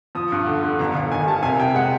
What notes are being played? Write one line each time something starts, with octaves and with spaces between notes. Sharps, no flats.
F3 D#6
G2
D3
D3
G1 A#5
G1
D#3 G#5
G3 A5
C3 G#5
C3 G5
G#3 F#5